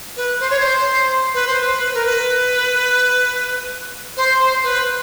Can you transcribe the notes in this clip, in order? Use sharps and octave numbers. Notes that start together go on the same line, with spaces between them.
B4
C5
C#5
C5
B4
C5
B4
A#4
B4
C5
C5
B4